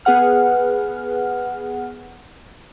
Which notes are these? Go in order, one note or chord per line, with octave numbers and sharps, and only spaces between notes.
B3 G#4 B4 F#5 F6